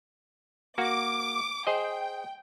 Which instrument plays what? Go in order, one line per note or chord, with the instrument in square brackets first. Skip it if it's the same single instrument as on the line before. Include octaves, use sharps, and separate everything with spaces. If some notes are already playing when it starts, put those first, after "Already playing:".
[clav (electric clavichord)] A#3 F#4 [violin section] D6
[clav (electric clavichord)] G#4 C5 D#5 [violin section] G5